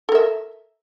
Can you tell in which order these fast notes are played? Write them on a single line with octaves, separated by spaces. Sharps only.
A4 A#4 E5